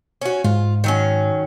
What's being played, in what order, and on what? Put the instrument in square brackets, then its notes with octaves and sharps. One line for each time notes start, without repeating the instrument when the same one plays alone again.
[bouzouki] C#4 F#4
[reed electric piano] G#2 [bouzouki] F4
[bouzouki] D#3 F#3 C#4